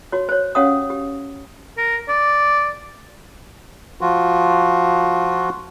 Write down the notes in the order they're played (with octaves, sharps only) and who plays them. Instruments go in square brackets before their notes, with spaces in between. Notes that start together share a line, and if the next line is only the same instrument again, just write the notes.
[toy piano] F#4 C#5
C5 C#5
C#4 G4 C#5 F5 F#5 D#6
G4
[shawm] A#4
D5
[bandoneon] F3 F4 F#4